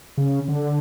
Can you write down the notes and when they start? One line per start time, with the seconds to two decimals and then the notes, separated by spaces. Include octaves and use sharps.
0.18 C#3
0.48 D3